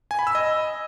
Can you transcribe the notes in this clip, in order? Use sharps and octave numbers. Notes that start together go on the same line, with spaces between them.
G#5
B5
E6
D#5